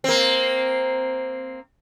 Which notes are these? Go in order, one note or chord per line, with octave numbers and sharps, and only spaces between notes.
A#3 C4